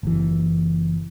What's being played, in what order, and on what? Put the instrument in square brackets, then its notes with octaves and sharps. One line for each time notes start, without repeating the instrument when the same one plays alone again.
[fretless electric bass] F#1 E3